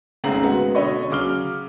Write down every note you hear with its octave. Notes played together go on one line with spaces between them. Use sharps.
G#1 C#3 A3 C4 A#5 F#7
G#3 B3 F#4
B2 D3 C#5 D#5 B5 C#6
C#3 F#3 D6 F6 G7